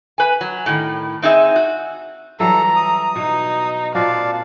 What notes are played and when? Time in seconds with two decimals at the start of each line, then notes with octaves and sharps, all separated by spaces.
0.18 B4 G#5
0.41 F#3
0.66 A2 D#3
1.22 C4 D#4 G#4 E5
1.56 F#4
2.40 E3 F#3 G3 A4 A#5
2.76 D#6
3.16 B2 D#4
3.95 A#2 C4 F#4 D5 F5 A5